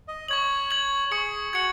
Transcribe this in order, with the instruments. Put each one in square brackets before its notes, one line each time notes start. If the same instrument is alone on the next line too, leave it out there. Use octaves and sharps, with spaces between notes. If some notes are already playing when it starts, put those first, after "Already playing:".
[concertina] D#5
[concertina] C#5 [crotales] C#6 G#6 F#7
[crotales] G#6 F#7
[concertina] G#4 [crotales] C#6 G#6 C#7 F#7
[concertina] F#4 [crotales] G#6 C#7 F#7